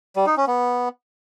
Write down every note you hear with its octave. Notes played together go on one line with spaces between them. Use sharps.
G3
D#4
C#4
B3